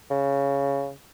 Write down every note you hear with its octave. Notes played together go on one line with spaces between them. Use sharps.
C#3